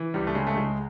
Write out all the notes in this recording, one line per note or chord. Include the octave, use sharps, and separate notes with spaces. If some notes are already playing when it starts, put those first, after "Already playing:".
Already playing: E3
C#2 G3
A3
C#3 G#3
A3
C#2 G#3